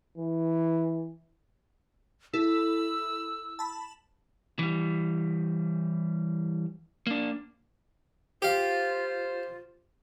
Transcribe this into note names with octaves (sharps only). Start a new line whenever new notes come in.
E3
E4 A4 E6
A5 B5
E3 G3
A#3 D4
F4 G4 C5 F5